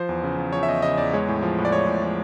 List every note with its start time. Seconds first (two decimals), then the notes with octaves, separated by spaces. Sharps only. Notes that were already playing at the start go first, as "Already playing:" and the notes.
Already playing: F3 C5
0.09 E2
0.24 C#3
0.38 E2
0.53 F3 C#5
0.63 E5
0.68 E2 D#5
0.82 C#3 D#5
0.98 E2 D5
1.13 G#3 C#5
1.28 A2
1.42 F3
1.58 A2
1.65 D5
1.72 G#3 C#5
1.87 A2
2.03 F3